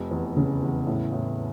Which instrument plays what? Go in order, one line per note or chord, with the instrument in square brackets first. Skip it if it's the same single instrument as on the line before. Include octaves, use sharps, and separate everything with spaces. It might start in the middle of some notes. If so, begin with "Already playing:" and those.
Already playing: [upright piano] F1
E2
C#3
E2
A2
A2